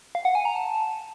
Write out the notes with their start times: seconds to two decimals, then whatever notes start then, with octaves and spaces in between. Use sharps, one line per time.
0.15 F5
0.25 F#5
0.35 G#5
0.45 A#5
0.55 A5